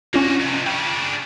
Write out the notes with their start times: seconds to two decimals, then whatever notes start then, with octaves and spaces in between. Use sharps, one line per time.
0.14 A#3 C#4 D4 F4 F#4
0.40 F2 C3
0.66 C#3 D4 G5 C#6